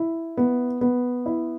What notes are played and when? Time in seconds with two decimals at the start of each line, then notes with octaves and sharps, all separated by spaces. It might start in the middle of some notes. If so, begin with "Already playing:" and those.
Already playing: E4
0.37 B3
0.81 B3
1.26 E4